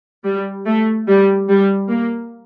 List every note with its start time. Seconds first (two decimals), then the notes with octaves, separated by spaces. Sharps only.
0.24 G3
0.66 A3
1.07 G3
1.48 G3
1.89 A#3